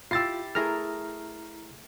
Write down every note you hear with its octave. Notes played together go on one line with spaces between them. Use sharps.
E4 F4 G4 E6 A6 C7
A3 E4 G#4 A#4 A#5 F6